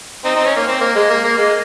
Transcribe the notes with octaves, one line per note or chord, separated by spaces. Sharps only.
C4 D#4
C4 D#4
C#4
A#3
C4
A#3
G#3
A#3
A#3
G#3